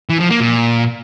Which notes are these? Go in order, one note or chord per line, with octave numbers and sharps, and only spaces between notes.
E3
F3
A#3
A#2